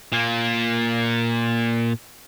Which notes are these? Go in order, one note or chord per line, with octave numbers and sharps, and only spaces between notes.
A#2 A#3